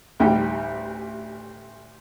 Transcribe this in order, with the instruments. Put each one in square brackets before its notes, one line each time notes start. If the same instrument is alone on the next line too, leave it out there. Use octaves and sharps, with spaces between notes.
[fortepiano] A1 D2 G3 D#4 G5